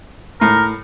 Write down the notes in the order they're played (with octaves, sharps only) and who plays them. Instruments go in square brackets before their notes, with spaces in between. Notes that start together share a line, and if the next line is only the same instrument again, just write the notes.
[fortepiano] A2 [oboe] A#4